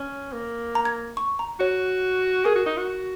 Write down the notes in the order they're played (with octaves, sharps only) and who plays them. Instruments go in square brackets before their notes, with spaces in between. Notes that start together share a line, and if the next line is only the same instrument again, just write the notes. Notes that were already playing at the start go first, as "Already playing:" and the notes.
Already playing: [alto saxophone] C#4
A#3
[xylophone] A#5
G#6
C#6
A#5
[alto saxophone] F#4 [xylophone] C#5
[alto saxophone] G#4 [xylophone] A#4
[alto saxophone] F#4
D#4
F#4